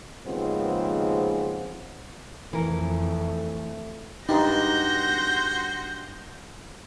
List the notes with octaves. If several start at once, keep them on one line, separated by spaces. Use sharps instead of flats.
D#2 G#2 C#3 F3 B3 C4
F2 E3 A3 A#4
G2 G3 D#4 F#4 C6 G6 A#6